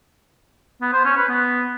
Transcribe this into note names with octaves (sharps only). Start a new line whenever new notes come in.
B3
C5
C#4
B4
B3